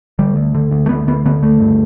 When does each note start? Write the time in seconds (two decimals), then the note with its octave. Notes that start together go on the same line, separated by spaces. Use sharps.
0.19 D3 G3
0.36 D2
0.54 D3
0.71 D2
0.86 A3
0.89 D3 B3
1.07 D2 B3
1.25 D3 B3
1.43 D2 A3
1.60 G2